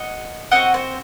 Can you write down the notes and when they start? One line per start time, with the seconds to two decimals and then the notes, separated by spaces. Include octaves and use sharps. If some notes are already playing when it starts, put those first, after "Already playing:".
Already playing: D#5 F#5
0.51 C4 F#4 D#5 F#5
0.74 C5